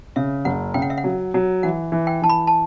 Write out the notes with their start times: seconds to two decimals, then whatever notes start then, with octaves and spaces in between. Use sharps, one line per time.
0.16 C#3 E5
0.45 F#1 F#5
0.74 C#3 G5
0.82 F#5
0.90 E5
0.98 F#5
1.04 F#3
1.34 F#3
1.63 E3 F#5
1.92 E3
2.07 G5
2.22 E3 A5
2.29 B5
2.47 A5